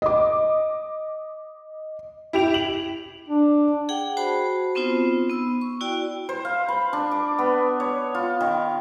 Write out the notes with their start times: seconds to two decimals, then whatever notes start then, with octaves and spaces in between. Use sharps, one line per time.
0.02 D#5 D6
2.33 E4 G4 F7
2.54 F#7
3.29 D4
3.89 G#4 F#5 G5
4.17 F#4 C5 A5 B5
4.75 B3 C4 D#4 F4 C5
5.29 B3 E6
5.61 C#6
5.81 E4 F#4 D5 G5
6.29 C5
6.45 F5
6.68 B5
6.93 D4
7.11 D6
7.39 B3
7.80 C#5
8.15 F4
8.40 D#3